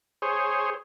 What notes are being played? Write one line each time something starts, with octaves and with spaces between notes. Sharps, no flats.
G#4 C5 C#5